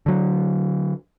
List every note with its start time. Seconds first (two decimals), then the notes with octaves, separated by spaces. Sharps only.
0.06 D3 F#3